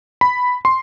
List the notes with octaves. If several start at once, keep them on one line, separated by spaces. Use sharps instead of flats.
B5
C6